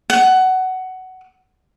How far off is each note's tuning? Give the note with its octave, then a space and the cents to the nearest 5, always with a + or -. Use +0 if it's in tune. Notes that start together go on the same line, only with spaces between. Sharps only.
F#5 +15